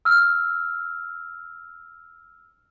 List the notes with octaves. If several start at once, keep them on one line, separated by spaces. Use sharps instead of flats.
E6 F6